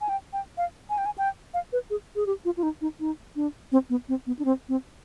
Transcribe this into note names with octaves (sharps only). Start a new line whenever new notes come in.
G#5
G5
G5
F5
G#5
G5
G#5
G5
F5
B4
G#4
G#4
G4
F4
F4
D#4
D#4
D#4
D4
C4
B3
C4
B3
D4
C4
C4